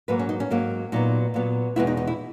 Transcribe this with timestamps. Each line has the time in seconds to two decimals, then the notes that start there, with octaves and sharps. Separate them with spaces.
0.08 G#2 F#3 A#3 B4
0.19 C#4
0.29 D#4
0.40 C#4
0.50 G#2 F#3 A#3
0.92 A#2 F#3 B3 D#4
1.34 A#2 F#3 B3
1.76 E2 B2 G#3 B3 E4
1.87 D#4
1.97 D#4
2.07 E4